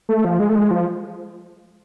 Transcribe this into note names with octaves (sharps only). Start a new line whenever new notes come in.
A3
F3
G#3
A3
G#3
F3